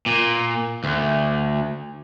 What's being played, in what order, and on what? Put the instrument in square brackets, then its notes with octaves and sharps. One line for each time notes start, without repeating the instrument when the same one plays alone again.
[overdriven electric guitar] A#2
D2